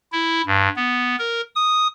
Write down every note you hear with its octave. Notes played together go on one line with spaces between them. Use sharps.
E4
G2
B3
A#4
D#6